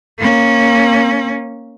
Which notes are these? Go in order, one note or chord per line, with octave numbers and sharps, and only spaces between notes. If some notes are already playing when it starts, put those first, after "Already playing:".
A#3 C#4